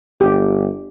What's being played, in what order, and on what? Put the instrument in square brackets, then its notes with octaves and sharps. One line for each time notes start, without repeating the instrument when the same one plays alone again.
[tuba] G1 [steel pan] G4